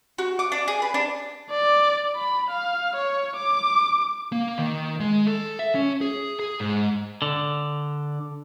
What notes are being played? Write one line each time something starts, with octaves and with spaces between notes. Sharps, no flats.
F#4
D6
D4
G#4
B4
D4
D5
B5
F5
C#5
D6
A#3
D#3
G#3
A4
E5
C#4
G#4
G#4
G#2
D3